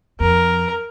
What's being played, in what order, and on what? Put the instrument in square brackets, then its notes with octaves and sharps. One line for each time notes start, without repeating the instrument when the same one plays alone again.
[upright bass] F2 [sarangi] A#4